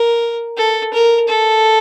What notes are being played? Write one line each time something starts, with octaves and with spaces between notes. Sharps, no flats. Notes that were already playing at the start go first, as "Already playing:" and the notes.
Already playing: A#4
A4
A#4
A4